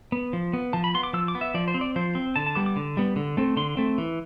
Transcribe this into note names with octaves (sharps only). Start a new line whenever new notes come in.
B3
F3
B3
F3 A5
B5
B3 C6
D6
F3 E6
D6
B3
E5
F3 D5
C5
C4
D5
F3 C5
C4
D3 A5
A5
G3 B3 D6
D6
D3
G3 B3
D3
A3 C4
D3 C6
A3 C4
E3